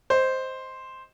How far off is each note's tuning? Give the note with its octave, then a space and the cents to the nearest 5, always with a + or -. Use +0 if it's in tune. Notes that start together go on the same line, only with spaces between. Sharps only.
C5 +0 D#5 +0